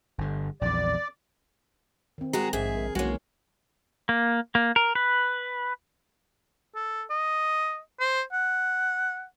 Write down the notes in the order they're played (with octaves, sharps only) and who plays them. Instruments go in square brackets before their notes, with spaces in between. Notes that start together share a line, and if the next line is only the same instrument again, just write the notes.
[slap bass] G1 D3
[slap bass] A#1 E2 [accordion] D5
[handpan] D#3 C4
[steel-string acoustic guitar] G#3 F#4 G#4 [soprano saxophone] A#5
[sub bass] A#1 [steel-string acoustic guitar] G#2 E5 [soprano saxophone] G#4
[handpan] A#4
[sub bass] B1 [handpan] E3 C#4 C#5 [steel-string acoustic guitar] G#3 A#3 [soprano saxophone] F#4
[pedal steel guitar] A#3
A#3
A#4
B4
[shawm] A4
D#5
C5
F#5